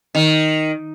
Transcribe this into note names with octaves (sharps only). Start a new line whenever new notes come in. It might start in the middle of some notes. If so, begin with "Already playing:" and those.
D#3